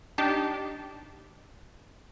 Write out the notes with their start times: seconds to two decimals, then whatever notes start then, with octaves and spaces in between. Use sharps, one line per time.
0.18 D4 D#4 G4 A5